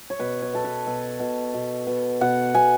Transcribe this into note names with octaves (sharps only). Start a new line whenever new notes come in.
C#5
B2 B4
C#5
B2 A4
B4
B2 A4
B2
B2
B2
B2 F#5
B2 G#5